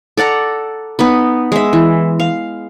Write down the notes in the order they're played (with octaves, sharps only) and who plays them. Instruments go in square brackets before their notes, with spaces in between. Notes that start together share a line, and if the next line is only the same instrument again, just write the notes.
[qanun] A4 D5 F#5 A#5
B3 D#4 B4
G#3 E5
E3
F5